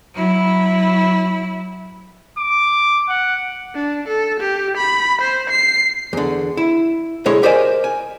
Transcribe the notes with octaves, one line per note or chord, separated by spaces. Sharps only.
F#3 E4
D6
F#5
D4
A4
G4
B5
C5
C7
E2 D3
E4
B1 D3 G#3 E4 C#5
G4 A#4 C5 D5 D#5 G#5
G#5